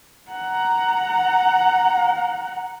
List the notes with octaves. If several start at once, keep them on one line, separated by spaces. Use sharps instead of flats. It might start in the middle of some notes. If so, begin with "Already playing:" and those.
F#5 A#5